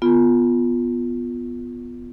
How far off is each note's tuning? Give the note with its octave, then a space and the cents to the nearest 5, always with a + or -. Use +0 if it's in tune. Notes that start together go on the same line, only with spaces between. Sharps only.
B3 +0 F4 +0